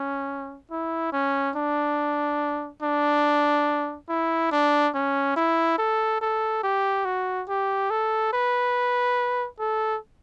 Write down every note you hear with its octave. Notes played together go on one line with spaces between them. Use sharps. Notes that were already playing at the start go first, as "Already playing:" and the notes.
Already playing: C#4
E4
C#4
D4
D4
E4
D4
C#4
E4
A4
A4
G4
F#4
G4
A4
B4
A4